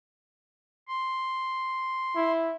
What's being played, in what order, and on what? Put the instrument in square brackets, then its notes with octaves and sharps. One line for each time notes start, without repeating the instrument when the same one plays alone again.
[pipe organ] C6
[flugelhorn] E4